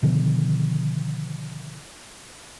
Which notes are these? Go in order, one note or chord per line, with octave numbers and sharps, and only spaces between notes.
B2 D3 D#3 F3